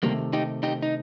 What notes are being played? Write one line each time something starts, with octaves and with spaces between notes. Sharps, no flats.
C3 D#3 G3 A3 A#3
D#4 G4
D#4 G4
D#4